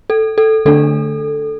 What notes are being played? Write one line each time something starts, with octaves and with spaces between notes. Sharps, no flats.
A4
A4
D3 A3 D4 A4